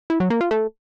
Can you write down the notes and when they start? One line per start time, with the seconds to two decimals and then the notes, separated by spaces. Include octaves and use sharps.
0.10 E4
0.20 F#3
0.30 A#3
0.41 F4
0.51 A3